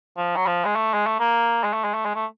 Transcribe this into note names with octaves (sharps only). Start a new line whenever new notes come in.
F3
F#3
F3
G#3
A3
G#3
A3
A#3
G#3
A3
G#3
A3
G#3
A3